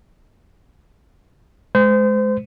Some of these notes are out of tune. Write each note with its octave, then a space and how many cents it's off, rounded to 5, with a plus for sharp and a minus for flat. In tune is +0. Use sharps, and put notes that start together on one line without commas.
G#3 +20 C5 -30